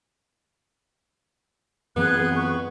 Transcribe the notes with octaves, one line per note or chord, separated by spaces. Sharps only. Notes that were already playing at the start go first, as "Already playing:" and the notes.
F#2 E3 B3 C4 G#4 F#6
C#6